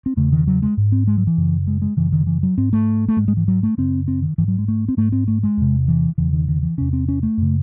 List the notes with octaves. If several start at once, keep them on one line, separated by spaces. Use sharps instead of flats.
C4
E2 C#3 A3
D#3
F#3
G#3
G#2
C4
G#3
F#3
E3
F#2 C#3
G#3
G#3
F#2 C#3 E3
D#3
E3
F#3
G#2 C4
A3
A3
G#2 G#3
G#3
E3
F#3
A3
F#2 C#3 C4
C4
D#3
G#2 E3
F#3
G#3
A3
C4
G#2 A3
C4
A3
G#3
E2 C3
E3
E2 C#3 E3
D#3
D#3
E3
E2 C3 C#4
C4
C#4
A3
F#2 C#3